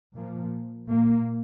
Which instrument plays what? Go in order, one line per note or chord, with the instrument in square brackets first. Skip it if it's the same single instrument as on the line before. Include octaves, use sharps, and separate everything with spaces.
[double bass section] A#2 F3 A#3
A#2 A#3